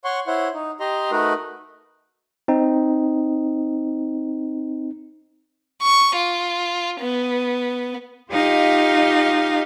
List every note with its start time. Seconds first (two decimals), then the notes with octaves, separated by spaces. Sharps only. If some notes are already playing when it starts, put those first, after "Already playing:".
0.05 C#5 F#5 C6 C#6
0.27 E4 C5 C#5 F#5
0.54 D#4
0.80 G4 D#5 A#5 C6
1.12 A3 D#4 F#4 A#4 B4
2.48 C4 D#4
5.83 C#6
6.15 F4
7.00 B3
8.32 D#4 F4 G4 D#5 F5